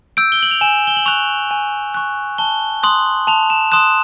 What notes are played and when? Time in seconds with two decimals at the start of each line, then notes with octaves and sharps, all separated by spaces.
0.17 E6 G6 D7
0.32 G7
0.43 F#7
0.51 F7
0.61 G#5 E7
0.87 G7
0.97 F#7
1.06 C#6 F#6 F7
1.51 G#5
1.94 C#6 F#6
2.38 A5 G7
2.83 C6 D#6 F#6 F#7
3.27 A5 F7
3.50 E7
3.72 C6 D#6 F#6 E7